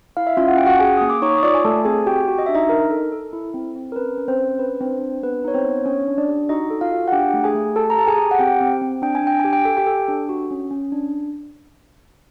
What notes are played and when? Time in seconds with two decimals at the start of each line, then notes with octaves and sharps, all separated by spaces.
0.17 E4 F5
0.27 E5
0.37 C#4 F4 F5
0.48 F#5
0.57 C#4 G5
0.66 F#4 F#5
0.79 G#4 G#5
0.97 A#3 D#6
1.10 D6
1.22 D#4 C#5 C#6
1.38 D#6
1.43 F4 D5 D6
1.55 G#5
1.65 A3 A4 A5
1.85 C4 G#4 G#5
2.06 F#4 G4 G5
2.28 F#4
2.39 D#5
2.46 D4 E5
2.55 D#4 D#5
2.69 D#4 A#4
2.91 A4
3.12 A4
3.33 E4
3.54 C4
3.76 C4
3.92 A#4
3.96 C#4 B4
4.17 C#4
4.28 C4 C5
4.39 C#4
4.59 D4 B4
4.81 C4 D4 C5
5.01 D4
5.23 B3 B4
5.44 D#4 C#5
5.54 C4 C5
5.65 B3
5.86 C#4 D4 C#5
6.07 D4
6.18 D4 D5
6.28 G4
6.49 D#4 F#4 D#5
6.70 A4
6.81 F4 F5
6.92 F#4
7.08 F#5
7.12 D4 G4 G5
7.34 A3
7.44 G#4 G#5
7.55 A3
7.76 G4 A4 A5
7.90 A#5
7.98 G4 A5
8.07 G#4 G#5
8.18 G4
8.31 F#5
8.39 C4 G4 G5
8.60 C4
8.82 C4
9.02 D4 G5
9.15 G#5
9.23 D4 G5
9.40 G4 G#5
9.53 G5
9.65 A4 G#5
9.77 G4 G5
9.87 A4
10.08 D4
10.29 F#4
10.51 C#4
10.71 C#4
10.92 D4